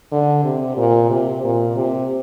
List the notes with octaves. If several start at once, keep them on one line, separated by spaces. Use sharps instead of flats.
D3
C3
A#2
C3
A#2
C3